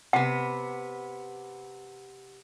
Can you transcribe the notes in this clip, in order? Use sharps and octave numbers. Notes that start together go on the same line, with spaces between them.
C3 B3 F#5